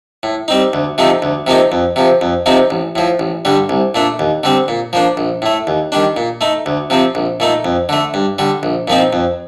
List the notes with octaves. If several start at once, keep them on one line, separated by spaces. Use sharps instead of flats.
A2
G3 C4 D#4
D2
C3 F3 A3 D#4
D2
C3 F3 A#3 D#4
F2
C3 F3
F2
C3 F3 C4 D#4
A1
A2 F3
A1
G2 D3 G3
C2
A#2 A3 D4
D#2
D3 G3 C4
A#2
F3 A#3 D4
A#1
A2 A3
D#2
D#3 G3 D4
A#2
A3 D#4
D2
C3 F3 C4
A#1
A#2 A3 D#4
F2
D3 A3
G2
D3 G3
A#1
A#2 F3 C4 D#4
F2